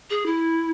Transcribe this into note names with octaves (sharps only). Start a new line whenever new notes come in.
G#4
E4